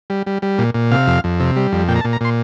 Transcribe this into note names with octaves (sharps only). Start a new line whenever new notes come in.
G3
G3
G3
A#2
A#2
C3 F5
F2
F2
C3
G3
F2
A#2 G5
A#5
A5
A#2
A#5
A#2 C6